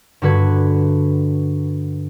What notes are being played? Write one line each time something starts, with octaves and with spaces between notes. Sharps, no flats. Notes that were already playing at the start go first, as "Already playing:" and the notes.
G2 D3 F#4 B4 G#6